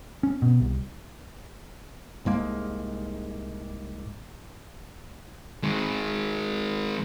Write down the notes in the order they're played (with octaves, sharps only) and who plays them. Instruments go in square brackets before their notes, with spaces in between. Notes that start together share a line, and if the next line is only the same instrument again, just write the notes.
[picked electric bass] C#4
B2
C2
C2 G#2 G#3 A#3
[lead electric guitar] D#3 G#3